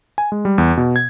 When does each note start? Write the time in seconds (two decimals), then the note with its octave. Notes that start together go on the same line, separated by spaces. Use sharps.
0.18 G#5
0.32 G#3
0.45 G3
0.58 E2
0.77 B2
0.96 G#6